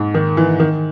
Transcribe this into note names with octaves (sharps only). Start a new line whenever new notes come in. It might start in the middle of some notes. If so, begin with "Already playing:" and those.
Already playing: G#2
D#3
E3
D#3